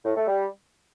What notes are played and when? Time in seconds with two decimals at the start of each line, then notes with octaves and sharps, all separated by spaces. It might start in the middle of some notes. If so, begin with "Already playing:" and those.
0.05 A2
0.16 A3
0.27 G3